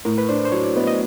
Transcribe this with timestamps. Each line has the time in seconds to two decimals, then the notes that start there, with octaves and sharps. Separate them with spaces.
0.05 A2 A#4
0.18 B4
0.29 D4 C5
0.45 C5
0.52 F#3 C#5
0.64 D5
0.76 B3 D#5
0.87 D#5